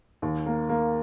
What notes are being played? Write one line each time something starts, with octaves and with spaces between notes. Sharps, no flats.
D#2
A#3
A#3